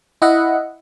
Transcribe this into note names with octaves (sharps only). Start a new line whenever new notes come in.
E4 D#5 E5 F#5